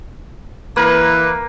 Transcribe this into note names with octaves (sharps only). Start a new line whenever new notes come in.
E3 A#3 B4